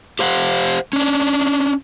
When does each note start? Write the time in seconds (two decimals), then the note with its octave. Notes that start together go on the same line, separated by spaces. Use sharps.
0.19 G4 C5 F5 F#5
0.93 C#4 D4